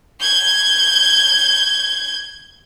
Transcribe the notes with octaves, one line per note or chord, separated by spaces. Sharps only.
G6 G#6